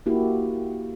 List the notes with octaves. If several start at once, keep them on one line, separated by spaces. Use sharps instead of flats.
A#3 E4 F#4 G4